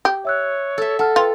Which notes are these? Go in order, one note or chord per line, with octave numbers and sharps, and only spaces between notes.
G4
C#5 E5 E6 F#6
A4 E5
A4 F#5 A5 F6
F4 B4 G5